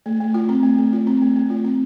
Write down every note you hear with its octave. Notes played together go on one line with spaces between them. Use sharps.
A3
A3
F4
C4
A3
A3
F4
C4
A3
A3
F4
C4